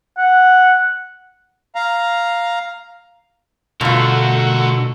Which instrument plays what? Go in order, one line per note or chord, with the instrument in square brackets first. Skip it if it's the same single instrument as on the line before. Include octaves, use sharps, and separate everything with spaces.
[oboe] F#5
[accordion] F5 A#5
[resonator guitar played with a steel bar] G2 F4 [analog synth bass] B2 [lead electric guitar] D3 A3 [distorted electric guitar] F#4 A#4